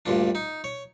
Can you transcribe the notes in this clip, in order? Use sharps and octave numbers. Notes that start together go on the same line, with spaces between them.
D2 G2 A#2 D4
D#4
C#5